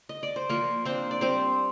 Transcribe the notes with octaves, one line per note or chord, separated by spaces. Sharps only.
D#5
D5
C5
F3 A#3 A#4
A#3 C4 D4 C5
D5
G3 C4 C5